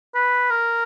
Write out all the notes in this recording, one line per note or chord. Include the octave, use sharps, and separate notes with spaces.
B4
A#4